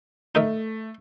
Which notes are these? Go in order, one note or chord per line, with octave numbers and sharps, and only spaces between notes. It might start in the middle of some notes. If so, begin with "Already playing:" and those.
A3 D#4 A#4 E5